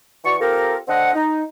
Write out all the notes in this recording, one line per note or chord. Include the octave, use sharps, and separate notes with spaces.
E3 F#4 D5 C#6
C4 F4 G4 A4 A#4
D3 C4 D#5 F#5
D#4